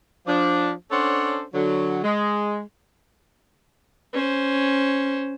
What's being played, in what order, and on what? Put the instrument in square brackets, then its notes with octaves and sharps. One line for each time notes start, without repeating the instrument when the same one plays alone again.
[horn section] F3 D4
C#4 D4 A4 C5 C#5 F#5
D3 F#3
G#3
[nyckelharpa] C#4 C5